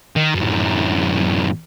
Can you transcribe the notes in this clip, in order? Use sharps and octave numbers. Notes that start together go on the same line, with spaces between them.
D#3
F#2 A2